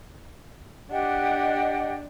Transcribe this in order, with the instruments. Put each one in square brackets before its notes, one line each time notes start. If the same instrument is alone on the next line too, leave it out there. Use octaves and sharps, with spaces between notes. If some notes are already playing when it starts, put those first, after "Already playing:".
[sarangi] D4 [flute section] G4 D#5 F#5